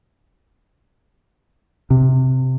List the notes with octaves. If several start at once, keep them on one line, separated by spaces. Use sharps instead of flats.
C3